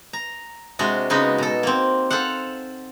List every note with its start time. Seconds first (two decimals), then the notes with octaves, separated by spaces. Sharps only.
0.13 A#5
0.79 C3 G#3 D4 F#4
1.10 C#3 G#3 B3 D#4 F#4
1.38 B2 A4
1.63 A#3 C4
2.10 A4 C5 F5 F#5